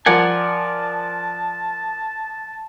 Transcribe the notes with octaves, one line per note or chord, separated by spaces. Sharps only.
F3 A#4 D5 F#5 G#5 A5